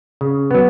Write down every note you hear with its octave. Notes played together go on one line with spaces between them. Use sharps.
C#3
F#3 B3